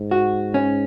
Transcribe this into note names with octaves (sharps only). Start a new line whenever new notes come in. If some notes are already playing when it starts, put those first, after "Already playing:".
Already playing: G#2
F#4
C#4